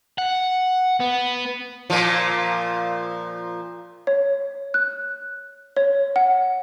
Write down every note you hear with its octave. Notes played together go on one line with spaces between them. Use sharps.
F#5
B3
A#2 F3
C#5
F#6
C#5
F#5